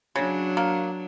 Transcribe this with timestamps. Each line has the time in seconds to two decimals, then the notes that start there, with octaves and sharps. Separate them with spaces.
0.16 C#3 F#3 D4
0.57 A#3